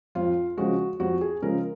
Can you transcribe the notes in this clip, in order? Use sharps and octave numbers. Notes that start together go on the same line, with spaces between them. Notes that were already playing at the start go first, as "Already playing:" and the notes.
F2 F4
C#3 F3 G#3 F#4
F2 F#4
G#4
C#3 F3 G#3 A#4